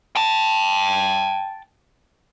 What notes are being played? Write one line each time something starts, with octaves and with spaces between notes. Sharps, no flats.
G5 A5